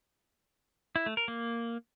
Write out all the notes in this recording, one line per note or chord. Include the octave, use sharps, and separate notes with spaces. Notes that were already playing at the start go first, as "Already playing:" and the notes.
E4
A3
A#4
A#3